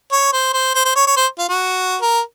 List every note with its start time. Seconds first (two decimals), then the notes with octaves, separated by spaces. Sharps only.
0.12 C#5
0.33 C5
0.53 C5
0.75 C5
0.85 C5
0.96 C#5
1.07 C#5
1.17 C5
1.38 F4
1.49 F#4
2.01 A#4